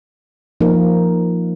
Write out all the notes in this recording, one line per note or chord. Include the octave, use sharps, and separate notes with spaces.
F3 A#3 D#4 A#4